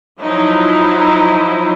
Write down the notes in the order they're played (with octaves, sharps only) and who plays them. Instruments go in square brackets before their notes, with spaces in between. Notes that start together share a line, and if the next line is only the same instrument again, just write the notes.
[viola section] F3 F#3 D#4 E4